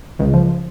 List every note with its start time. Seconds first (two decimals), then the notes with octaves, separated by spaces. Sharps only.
0.19 C#2
0.34 F3